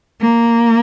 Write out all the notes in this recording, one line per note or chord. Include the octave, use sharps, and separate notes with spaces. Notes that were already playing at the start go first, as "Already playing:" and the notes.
A#3